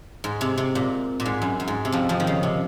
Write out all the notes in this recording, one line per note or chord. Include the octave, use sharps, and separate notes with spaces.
G#2
C3
C3
A#2
A#2
G#2
F#2
F#2
G#2
C3
F2 F3
F2 F3
D#3
C#3
C3